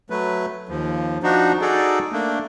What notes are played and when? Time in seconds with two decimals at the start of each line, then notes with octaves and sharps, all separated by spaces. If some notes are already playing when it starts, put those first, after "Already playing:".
0.10 F#3 A3 B4
0.69 D#2 F3
1.23 F3 D4 D#4 F#4
1.61 D#4 F#4 G#4 A4 D5
2.13 A3 A#3 D4